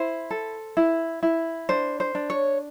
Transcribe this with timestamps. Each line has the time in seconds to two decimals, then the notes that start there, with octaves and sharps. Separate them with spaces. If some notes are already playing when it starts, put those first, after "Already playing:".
Already playing: E4 C5
0.31 A4
0.77 E4
1.23 E4
1.69 D4 C5
2.00 C5
2.15 D4
2.30 C#5